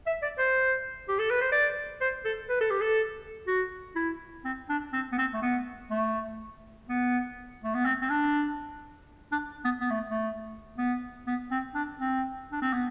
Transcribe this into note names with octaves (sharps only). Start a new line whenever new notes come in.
E5
D5
C5
G4
A4
B4
C5
D5
C5
A4
B4
A4
G4
A4
F#4
E4
C4
D4
C4
B3
C4
A3
B3
A3
B3
A3
B3
C4
C4
D4
D4
B3
B3
A3
A3
B3
B3
C4
D4
C4
D4
C4
B3